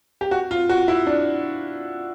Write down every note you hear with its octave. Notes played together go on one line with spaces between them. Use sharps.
G4
F#4
F4
F#4
E4
D4